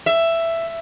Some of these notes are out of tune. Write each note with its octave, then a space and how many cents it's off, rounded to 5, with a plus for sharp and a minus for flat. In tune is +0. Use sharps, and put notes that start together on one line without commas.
E5 +10